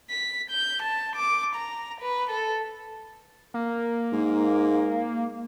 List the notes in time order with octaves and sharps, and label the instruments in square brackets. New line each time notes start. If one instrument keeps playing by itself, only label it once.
[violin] B6
G6
A5
D6
A#5
B4
A4
[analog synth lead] A#3
[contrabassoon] G#2